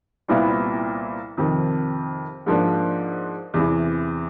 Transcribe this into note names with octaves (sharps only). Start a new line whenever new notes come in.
C2 A#2 G3 B3 E4
F2 C3 D#3
G#2 F3 A#3 D4
E2 C3 E3